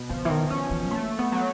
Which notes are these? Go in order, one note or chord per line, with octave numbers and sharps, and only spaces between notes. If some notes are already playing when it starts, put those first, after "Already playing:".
Already playing: B2
D3 F3
E3
D#3
E3 C#4
E3
A3 A#3
B3
F#3